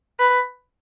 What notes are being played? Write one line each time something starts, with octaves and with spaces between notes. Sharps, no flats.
B4